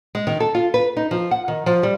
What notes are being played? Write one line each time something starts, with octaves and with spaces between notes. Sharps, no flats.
G#3
D#3
A4
F4
B4
D#4
F3
F#5
D#3
F3
G3